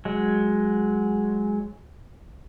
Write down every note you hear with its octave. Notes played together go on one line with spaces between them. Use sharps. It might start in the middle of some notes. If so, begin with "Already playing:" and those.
F#3 G#3